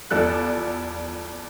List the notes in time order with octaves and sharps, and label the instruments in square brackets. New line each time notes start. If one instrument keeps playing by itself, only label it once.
[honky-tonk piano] E2 F3 G3 A4 F#6